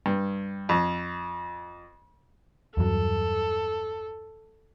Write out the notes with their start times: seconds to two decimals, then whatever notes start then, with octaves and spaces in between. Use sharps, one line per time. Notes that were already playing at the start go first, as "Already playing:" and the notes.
0.06 G2
0.69 F2
2.77 E2 G2 F#3 A4